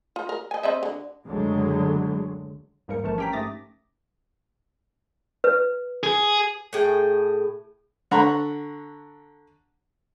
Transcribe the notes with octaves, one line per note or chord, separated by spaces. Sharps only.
F4
A#4
D#5 G#5
C4 D#5 E5
D3
F#1 D2 D3 F#3 G#3
D#2 G#2 G3 A#3 A#4 C#7
A1 E3 F3 A3 A#4 A5
C#4 G4 G5 A#5 B6
G#2 A3 D6 D#6 A6 A#6
B4
G#4
A2 G#4 G5
D3 F#5 A#5 B5 C#6